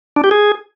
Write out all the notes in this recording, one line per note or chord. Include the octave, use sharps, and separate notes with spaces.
D4
G4
G#4